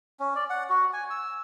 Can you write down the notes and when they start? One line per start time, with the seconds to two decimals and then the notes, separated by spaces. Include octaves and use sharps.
0.20 C#4
0.35 D5
0.50 F#5
0.70 F#4
0.93 G#5
1.10 E6